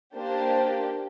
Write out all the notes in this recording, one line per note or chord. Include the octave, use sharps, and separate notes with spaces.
A#3 D4 G4 C5